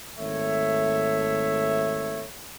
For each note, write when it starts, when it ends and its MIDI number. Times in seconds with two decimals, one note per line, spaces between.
0.18 2.26 32
0.18 2.26 57
0.18 2.26 73
0.18 2.26 76